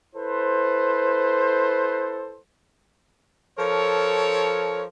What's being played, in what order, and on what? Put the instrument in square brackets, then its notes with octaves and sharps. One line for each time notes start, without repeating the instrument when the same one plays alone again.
[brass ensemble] E4 A4 B4 C5
[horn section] F3 A4 A#4 C#5